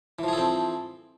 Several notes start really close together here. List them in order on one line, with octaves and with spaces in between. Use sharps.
E3 F3 G#4 A4 C4